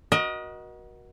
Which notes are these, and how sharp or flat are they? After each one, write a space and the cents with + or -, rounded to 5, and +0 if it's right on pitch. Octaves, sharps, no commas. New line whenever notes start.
F#4 +0 A#4 +40 D#5 +5